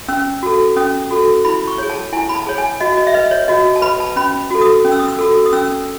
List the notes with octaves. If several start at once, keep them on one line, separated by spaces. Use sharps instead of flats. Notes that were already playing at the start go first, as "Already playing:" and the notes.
C#4 E6
F#4 A4
C#4 D#6
F#4 A4
E4 B5
C#6
G#4 C#5
A5
E4 G#5
B5
A5
G#4 C#5
G#5
F#4 D#5
D#5
E5
B4 D#5
C#5
F#4 D#5
A5
B4 B5
A5
C#4 B5
F#4 A4
D#6
C#4
E6
D#6
E6
F#4 A4
D#6
C#4 E6